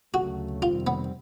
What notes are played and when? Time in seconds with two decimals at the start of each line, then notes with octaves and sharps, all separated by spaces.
0.14 D2 C#3 F#3 A3 F#4
0.62 F2 C3 D#3 G3 C4 F4
0.87 B3